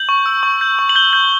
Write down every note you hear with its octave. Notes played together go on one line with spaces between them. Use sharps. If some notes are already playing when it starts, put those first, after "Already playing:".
Already playing: G6 F#7
C#6
E6
C#6
G6
C#6
F#7
G6 G7
G6